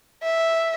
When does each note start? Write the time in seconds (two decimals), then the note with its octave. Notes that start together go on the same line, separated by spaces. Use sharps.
0.23 E5